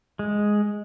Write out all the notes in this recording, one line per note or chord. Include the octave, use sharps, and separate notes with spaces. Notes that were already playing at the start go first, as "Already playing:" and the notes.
G#3